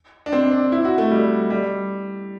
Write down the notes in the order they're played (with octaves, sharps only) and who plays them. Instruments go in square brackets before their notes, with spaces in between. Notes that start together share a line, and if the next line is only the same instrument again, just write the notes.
[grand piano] D4
C4
D4
E4
F#4
A3
G3
G3